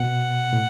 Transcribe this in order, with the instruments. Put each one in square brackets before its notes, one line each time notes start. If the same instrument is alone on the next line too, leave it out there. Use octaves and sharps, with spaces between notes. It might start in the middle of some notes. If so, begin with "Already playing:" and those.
Already playing: [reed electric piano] B2 [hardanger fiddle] F#5
[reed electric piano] A2